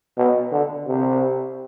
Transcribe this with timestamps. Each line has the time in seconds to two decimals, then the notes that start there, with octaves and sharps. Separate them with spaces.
0.17 B2
0.52 D3
0.87 C3